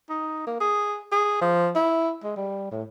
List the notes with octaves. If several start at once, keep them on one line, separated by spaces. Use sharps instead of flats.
D#4
A#3
G#4
G#4
F3
E4
G#3
G3
A2